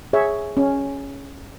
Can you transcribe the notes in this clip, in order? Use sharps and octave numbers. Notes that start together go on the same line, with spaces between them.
G#4 C#5 E5
C#4